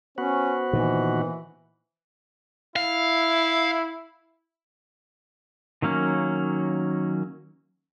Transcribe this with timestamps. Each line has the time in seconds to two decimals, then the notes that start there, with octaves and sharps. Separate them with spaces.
0.18 B3 C#4 F#4 C5
0.73 A#2 D#3 E3
2.76 E4 F5
5.82 D#3 F#3 A#3 C#4